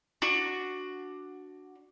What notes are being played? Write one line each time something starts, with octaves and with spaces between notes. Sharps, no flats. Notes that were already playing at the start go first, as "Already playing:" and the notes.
D4 F#4